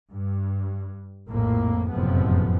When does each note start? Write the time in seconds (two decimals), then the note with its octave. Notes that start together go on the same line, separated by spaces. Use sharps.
0.11 G2
1.28 A#1 F2 A2 A#3
1.90 F#1 F2 A2 C3 F3 B3